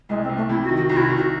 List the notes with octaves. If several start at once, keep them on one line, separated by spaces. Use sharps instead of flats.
C2 G#3
C4
C2
A3
C3 E4
F#4
D#3
F#4
C2 F#4
E4
F#4
C2
F#4